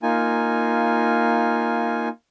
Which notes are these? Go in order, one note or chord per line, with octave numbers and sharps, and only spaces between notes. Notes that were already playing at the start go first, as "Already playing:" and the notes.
A#3 D#4 F4 G#5